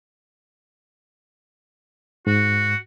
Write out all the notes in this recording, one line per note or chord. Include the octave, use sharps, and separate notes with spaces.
G#2 F#4